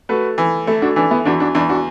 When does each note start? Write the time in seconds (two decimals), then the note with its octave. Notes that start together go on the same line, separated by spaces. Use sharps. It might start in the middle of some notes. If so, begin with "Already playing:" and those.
0.09 A3 F#4 B4
0.38 E3
0.67 A3 E4 A4
0.82 D4 F#4
0.96 E3 D4
1.11 B3 E4
1.25 E2 D4 F#4
1.40 D4 F#4
1.55 E2 D4
1.69 D4 F#4